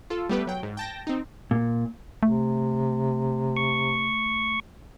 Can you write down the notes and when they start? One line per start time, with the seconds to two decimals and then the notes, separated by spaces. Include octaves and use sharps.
0.10 F4 A4
0.29 G3 A3 B3 G4 B4
0.47 F#3 G5
0.63 G#2
0.77 G5 A5 A#6
1.07 C4 D#4
1.51 A#2
2.23 C3 A3
3.57 C#6